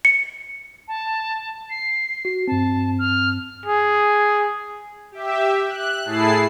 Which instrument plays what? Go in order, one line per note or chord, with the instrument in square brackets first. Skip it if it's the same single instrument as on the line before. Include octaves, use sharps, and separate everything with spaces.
[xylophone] C#7
[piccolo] A5
C7
[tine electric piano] F#4
[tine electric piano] G2 C4 [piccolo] A5
[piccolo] F6
[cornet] G#4
[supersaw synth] G4 E5
F#6
A2 E4 G#4 A5 C7